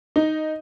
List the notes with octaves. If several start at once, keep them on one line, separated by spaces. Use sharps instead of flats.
D#4